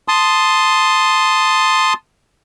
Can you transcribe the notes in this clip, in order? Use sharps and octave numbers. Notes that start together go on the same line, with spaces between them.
A5 C6 D#6